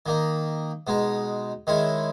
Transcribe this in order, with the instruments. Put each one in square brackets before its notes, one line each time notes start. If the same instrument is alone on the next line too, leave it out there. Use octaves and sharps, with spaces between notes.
[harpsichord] D#3 A#3 D#4
B2 G#3 D#4
D#3 G#3 C#4 E4